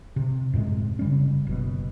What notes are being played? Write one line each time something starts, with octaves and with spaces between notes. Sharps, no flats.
C3
F#2 A2 C3 G#3
C#3 G3 C#4
F#1 B2